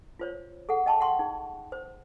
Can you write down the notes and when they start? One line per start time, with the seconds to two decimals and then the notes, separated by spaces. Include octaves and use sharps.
0.19 F4 C5 C#5
0.69 G#4 A4 F#5
0.86 D#5 G5 A5 B5 C#6
1.00 F#5 G5 C6 C#6
1.19 D#4 G#4
1.72 C5